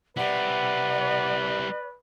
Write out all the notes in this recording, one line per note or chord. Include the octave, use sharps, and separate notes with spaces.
G3 E4 B4 D5 F#5